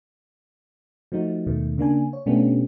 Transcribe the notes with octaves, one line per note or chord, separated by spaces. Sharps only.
F3 A3 D#4 F#4
D#2 B2 D#3 A3
C#3 A#3 D4 G#5
C#5
B2 A3 B3 C#4 D4 G4